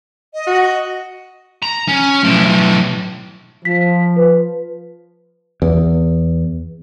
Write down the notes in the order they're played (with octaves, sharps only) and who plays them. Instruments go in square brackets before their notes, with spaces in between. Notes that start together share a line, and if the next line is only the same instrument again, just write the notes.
[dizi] D#5
[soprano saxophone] F#4
[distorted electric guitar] A#5
C#4
B1 A2
[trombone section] F3 [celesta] B6
[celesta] B4
[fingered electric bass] E2